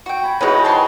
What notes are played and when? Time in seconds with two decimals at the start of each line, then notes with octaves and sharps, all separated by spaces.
0.06 F#4 G5
0.23 G#5 B5
0.41 E3 G#3 C#4 D#4 F#4 B4
0.64 C5 G5 A5